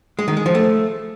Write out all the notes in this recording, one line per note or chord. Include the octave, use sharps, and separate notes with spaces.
G#3
D#3
G#3
F3
A3